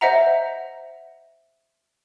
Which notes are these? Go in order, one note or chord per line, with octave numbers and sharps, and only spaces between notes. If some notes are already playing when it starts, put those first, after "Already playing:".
C5 D#5 E5 F#5 A#5